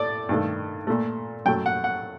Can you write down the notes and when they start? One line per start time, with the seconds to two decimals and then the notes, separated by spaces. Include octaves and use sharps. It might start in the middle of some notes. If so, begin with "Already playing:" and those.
Already playing: A2 A3 D5
0.29 G2 D#3 A3
0.87 A#2 A3
1.45 F#2 F#3 A3 G5
1.66 F#5
1.84 F#5